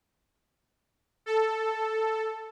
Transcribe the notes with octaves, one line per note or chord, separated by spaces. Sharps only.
A4